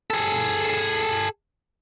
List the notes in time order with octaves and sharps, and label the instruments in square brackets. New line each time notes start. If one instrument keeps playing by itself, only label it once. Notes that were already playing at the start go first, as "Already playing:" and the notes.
[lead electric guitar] G#4 A4